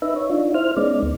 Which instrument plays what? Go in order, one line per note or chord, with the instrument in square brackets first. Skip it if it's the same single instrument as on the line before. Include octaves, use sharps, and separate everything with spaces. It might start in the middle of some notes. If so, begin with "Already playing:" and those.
[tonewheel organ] D#4 B4 E5
C#5
D4 D#4 F4
E4 C5 F6
G#3 B3 C#4 D#4 D5
D2